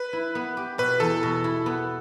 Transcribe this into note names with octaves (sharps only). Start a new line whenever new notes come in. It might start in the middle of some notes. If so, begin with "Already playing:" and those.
Already playing: B4
E4
B3
G4
B2 B4
E2 A4
B2
E4
B3